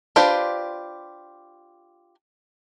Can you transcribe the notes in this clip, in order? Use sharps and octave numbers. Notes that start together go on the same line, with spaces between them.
D4 F4 G4 B4 C5